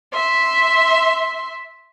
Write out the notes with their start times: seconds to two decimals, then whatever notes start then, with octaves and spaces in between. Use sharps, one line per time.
0.13 E5 C6